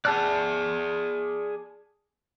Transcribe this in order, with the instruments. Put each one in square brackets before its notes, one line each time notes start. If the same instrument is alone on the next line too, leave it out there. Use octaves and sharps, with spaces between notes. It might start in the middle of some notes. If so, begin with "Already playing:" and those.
[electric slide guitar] G#4 D5 [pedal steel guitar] A5 F6 F#6